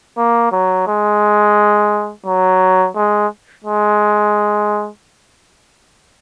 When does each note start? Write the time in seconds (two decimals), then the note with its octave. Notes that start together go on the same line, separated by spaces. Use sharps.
0.17 A#3
0.52 F#3
0.88 G#3
2.25 F#3
2.96 G#3
3.64 G#3